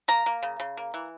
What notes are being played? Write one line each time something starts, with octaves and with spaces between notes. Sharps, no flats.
A#3 A#5
A#3
C#3
C#3
A#3
E3